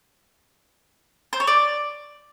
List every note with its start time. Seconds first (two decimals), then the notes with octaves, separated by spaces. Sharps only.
1.33 C5
1.40 C#5
1.47 D5